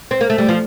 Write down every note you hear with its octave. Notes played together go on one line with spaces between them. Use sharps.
C4
A#3
A3
G3
F3